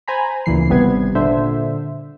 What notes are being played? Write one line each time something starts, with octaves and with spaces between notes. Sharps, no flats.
C5 G#5 A#5 B5
D2 A#2 C#3 E3 C7
G#1 C3 G3 B3 B4 G#6
A#2 D3 C5 E5